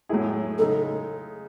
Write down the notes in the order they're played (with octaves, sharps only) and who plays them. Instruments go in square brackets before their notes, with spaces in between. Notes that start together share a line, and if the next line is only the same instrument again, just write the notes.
[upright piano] A2 F#3 A3 E4 G#4
[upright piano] C#3 G#3 D#4 [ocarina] A4